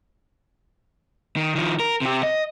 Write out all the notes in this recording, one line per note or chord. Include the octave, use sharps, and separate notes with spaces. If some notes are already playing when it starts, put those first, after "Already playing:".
D#3
D#3 F3
A#4
C3 G4
D#5